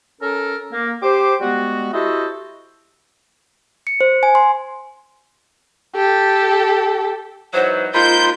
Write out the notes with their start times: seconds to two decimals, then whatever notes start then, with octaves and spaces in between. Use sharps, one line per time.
0.21 C#4 A4 A#4
0.72 A#3
1.02 G4 C5 D6
1.41 G3 G#3 B3 F#4
1.92 E4 F#4 G4 A4 C5 D#5
3.87 C#7
4.01 C5
4.23 G#5
4.35 C6
5.96 G4 A4
7.53 G#2 E3 F#3 C5
7.94 G#3 A#3 D#4 F4 C5 B5 G6